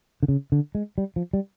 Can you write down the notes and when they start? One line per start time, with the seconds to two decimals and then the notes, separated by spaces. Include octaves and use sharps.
0.23 D3
0.28 C#3
0.52 D3
0.75 G#3
0.98 G3
1.16 F3
1.33 G3